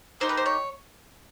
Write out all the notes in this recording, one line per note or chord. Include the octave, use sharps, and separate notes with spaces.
A#3 D#4 G4 C5
B4
C5
C#5